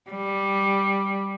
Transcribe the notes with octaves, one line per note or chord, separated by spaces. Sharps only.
G3